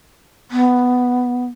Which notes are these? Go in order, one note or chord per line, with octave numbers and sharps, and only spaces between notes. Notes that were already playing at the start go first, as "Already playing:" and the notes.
B3